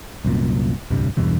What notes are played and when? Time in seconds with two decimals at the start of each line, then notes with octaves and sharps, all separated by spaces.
0.25 C2 F#2 A#2
0.91 D1 C2 G2 C3
1.17 E2 G2 B2 E3